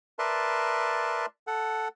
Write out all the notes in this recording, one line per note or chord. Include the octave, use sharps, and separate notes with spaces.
A#4 B4 D5 E5 A5 C6
A4 F#5